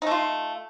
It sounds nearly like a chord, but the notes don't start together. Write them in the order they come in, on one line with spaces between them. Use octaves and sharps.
D#4 A3 F4